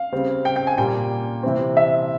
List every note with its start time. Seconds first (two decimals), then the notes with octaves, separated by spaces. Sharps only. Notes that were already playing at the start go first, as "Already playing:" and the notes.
Already playing: F5
0.12 C#3 G3 C4
0.45 G5
0.56 G5
0.67 G#5
0.78 A#2 G3 A#3 G5
1.43 C3 E3 G3 C4
1.77 E5